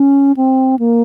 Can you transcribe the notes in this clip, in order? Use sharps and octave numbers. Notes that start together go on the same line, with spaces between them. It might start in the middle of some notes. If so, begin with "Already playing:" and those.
Already playing: C#4
C4
A#3